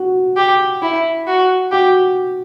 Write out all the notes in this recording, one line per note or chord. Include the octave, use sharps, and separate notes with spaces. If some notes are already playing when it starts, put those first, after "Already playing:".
Already playing: F#4
G4
E4
F#4
F#4 G4